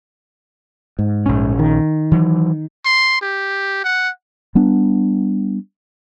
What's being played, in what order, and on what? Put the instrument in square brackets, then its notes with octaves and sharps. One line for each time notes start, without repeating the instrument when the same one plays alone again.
[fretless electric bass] G#2
[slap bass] A#1 C#4
[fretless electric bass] D#3
[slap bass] E3 F#3
[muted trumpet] C6
G4
F#5
[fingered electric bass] G3 B3 D4